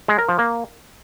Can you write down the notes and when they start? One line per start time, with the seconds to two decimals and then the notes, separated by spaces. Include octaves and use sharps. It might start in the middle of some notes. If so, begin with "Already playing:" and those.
0.08 G#3
0.18 A#4
0.29 F3
0.39 A#3